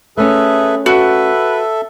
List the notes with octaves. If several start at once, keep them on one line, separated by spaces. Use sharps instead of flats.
A3 C#4 G#4 A4 B4 E5
F#4 A4 B4 E5